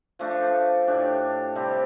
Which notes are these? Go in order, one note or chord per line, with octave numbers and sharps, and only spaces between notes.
F3 A3 D4
A2 A3 D4 G4
C3 G3 C4 G4